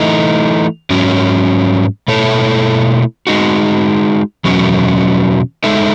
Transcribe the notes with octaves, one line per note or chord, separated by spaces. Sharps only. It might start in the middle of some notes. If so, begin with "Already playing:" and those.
Already playing: E3 A3 D#4
G#2 F#3 C#4
B2 A3 E4 A4 C#5
G#3 D#4 F#4
E2 B2 F#3 C#4 F#4
G#3 D#4 A4 E5